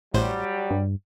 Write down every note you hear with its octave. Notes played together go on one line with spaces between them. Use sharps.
A1 A2 F#3 G3 C5
G2